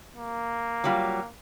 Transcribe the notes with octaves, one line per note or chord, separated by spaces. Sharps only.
A#3
F#3 G3 F4